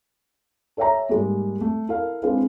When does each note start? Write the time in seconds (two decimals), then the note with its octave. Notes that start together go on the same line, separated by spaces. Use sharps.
0.77 A4 C#5 E5 G5 A#5
1.09 G#2 G3 G#3 A#3
1.61 A3
1.88 E4 A4 A#4 F5
2.23 G#3 C4 D4 E4 B4 F5